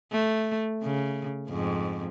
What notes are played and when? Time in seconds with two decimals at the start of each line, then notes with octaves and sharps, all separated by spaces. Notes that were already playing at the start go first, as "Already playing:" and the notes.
0.12 A3
0.83 C#3
1.49 F2 G#2